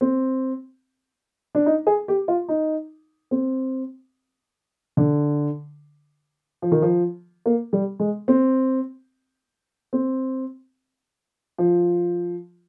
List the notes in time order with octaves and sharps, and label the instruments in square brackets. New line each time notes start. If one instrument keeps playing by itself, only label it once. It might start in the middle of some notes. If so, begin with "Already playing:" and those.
[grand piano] C4
D4
D#4
G#4
G4
F4
D#4
C4
D3
F3
D#3
F3
A#3
G3
G#3
C4
C4
F3